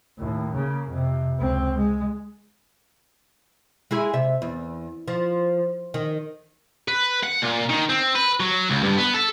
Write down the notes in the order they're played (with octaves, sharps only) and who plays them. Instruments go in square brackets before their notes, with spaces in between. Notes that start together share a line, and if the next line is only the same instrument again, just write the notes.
[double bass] D#2 A2
C#3 A#3
F2 C3
C#2 C4
G#3
[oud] G#3 E4 G#4
C3 E5
E2
F3
D#3
[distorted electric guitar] B4
F#5
A#2
D#3
C4
B4
F#3
C#2
G2
B3
A4